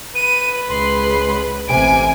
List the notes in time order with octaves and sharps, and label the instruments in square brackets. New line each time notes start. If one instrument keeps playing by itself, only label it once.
[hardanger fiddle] B4 [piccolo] D#7
[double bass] C#2 G#3 [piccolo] C6
[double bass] A1 C3 [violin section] G#5 [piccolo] D7